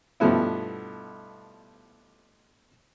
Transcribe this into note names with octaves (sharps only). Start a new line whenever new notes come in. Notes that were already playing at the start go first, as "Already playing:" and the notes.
G2 B2 F3 A3 B3 E4